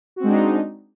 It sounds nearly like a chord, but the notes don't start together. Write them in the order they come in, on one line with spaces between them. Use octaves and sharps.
F#4 C4 G#3 D4 D#4